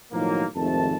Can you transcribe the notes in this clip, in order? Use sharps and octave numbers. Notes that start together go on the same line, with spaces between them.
B1 A2 D#3 F3 F#3 A#3
G#1 F2 C3 D#3 A3 A5